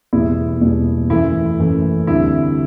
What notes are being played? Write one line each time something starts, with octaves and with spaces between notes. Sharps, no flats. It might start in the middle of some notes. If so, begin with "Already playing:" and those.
E2 B2 G3 E4
E2 B2 G3
F#2 E3 A3 E4
F#2 E3 A3
D2 C3 G3 E4